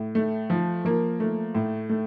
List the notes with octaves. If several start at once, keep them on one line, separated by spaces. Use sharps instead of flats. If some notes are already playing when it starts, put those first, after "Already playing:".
Already playing: A2
A3
F3
F3 A#3
A3
A2
A3